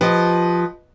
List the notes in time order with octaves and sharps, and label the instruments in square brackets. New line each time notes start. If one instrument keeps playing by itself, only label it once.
[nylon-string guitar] F3 G4 [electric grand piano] B4 D#5